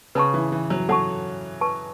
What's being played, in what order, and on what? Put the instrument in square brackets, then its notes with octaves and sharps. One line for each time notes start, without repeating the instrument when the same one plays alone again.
[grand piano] C#3 [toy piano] B4 A5 C#6
[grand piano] E3
E3
F#3
[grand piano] F#3 [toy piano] A4 F#5 A5 C#6
[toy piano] B4 A5 C#6